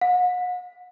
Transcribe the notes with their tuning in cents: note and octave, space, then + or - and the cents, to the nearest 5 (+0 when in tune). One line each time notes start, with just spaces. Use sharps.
F#5 -40